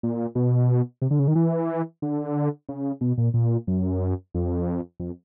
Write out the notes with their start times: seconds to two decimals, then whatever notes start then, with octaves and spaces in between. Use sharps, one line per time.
0.03 A#2
0.35 B2
1.02 C3
1.11 D3
1.19 C#3
1.28 D#3
1.35 E3
2.02 D3
2.69 C#3
3.01 B2
3.18 A#2
3.34 A#2
3.67 F#2
4.34 F2
5.00 F2